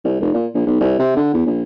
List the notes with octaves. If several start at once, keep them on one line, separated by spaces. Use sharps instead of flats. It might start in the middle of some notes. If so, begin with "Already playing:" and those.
C2
F1
A#2
A#1
B1
C2
C3
D3
E2
A#1